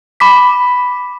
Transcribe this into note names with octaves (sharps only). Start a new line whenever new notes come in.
B5 D6 B6